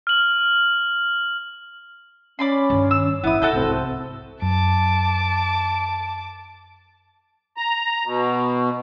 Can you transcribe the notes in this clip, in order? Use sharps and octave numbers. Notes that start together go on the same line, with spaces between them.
F6 F#7
C#4 D5 B5 C6
G2 D#3
E6
A1 B3 E4 D#6
C#3 G#3 F#4 A4 G6
C2 G#2 C4
F#2 A5 D6
A#5
B2